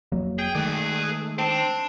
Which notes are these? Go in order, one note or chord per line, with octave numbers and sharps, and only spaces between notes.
F1 F#3 A#3
G#4 G5
D#3 G#3 A3 B4 D5
C4 D4 A5